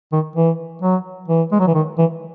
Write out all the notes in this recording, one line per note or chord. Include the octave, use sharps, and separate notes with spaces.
D#3
E3
F#3
E3
G#3
F#3
E3
D#3
E3